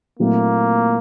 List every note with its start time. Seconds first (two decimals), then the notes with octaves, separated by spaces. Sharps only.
0.19 A#2 F#3 A3 A#3 C4 E4